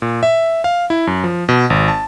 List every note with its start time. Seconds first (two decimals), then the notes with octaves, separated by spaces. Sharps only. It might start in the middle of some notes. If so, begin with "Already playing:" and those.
0.02 A#2
0.23 E5
0.64 F5
0.90 E4
1.07 F#2
1.24 F3
1.49 B2
1.70 G#1
1.88 A5